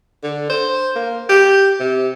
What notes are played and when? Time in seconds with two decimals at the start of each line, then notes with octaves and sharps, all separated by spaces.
0.23 D3
0.50 C5
0.96 A#3
1.29 G4
1.80 C3